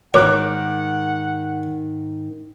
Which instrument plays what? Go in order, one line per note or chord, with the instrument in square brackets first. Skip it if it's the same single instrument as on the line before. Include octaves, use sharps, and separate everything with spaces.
[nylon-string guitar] G#2 D#3 [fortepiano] A#4 D6 F#6 [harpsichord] C#5 [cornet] F#5